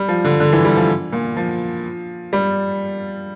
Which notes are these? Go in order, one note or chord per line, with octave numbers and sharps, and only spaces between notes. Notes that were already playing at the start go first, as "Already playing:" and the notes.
Already playing: G3
F3
D3
D3
E3
G3
F3
A#2
F3
G3